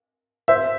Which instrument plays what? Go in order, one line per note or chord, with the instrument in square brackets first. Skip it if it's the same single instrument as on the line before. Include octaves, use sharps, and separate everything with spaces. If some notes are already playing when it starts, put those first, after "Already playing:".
[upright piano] C5 E5